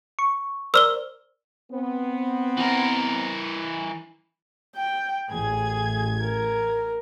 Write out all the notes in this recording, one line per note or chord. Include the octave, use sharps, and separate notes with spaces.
C#6
A#4 C5 D5 E6 F6 G7
B3 C4
E3 A#4
G5
A1 G#4 G#6
A#4